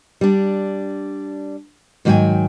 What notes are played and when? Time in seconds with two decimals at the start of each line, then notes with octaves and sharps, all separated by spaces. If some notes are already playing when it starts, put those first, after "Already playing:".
0.21 G3 D4
2.05 G#2 D#3 F#3 F4 G5 G#5